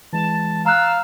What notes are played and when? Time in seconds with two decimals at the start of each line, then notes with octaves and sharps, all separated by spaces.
0.13 E3 G#3 A5
0.66 F5 A#5 E6 F#6